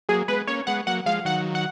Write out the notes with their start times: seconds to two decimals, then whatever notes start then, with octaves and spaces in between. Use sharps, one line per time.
0.09 F#3 A#3 G#4
0.28 G#3 B3 B4
0.47 A#3 C#4 C#5
0.67 G#3 B3 F#5
0.87 F#3 A#3 F#5
1.06 F3 G#3 F5
1.25 D#3 F#3 F#5
1.55 F#5